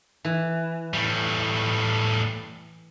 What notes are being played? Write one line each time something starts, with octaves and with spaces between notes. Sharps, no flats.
E3
A2 G3